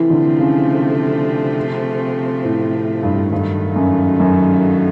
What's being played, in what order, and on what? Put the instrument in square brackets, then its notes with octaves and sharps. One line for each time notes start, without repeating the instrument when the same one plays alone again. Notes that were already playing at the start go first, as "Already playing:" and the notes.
Already playing: [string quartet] C3 F3 A3 C4 [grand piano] E3
[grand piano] D3
C#3
A2
G2
[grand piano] G2 [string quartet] D#3 F#3 A3
[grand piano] F#2
F#2